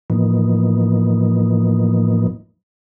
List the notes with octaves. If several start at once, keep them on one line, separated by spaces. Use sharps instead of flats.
A2 E3 F3 A#3 B3 D#4